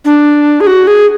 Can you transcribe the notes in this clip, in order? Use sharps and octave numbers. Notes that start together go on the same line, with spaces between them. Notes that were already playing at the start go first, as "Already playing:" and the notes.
D4
G#4
F#4
G#4